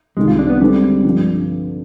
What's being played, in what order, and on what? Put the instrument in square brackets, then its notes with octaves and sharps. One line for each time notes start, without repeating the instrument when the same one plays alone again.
[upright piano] C2 C3 D#3 [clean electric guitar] G#3
[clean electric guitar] F4
D4
B3
[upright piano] D3 G#3 C4 [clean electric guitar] G3
[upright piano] G2 D3 F3